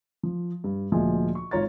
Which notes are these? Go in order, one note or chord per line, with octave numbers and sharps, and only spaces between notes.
F3
G2
D2 A#2 F3 G#3 G#5
C#6
G#1 F4 C#5 A#5 A6